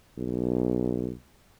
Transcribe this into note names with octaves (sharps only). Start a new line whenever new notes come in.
B1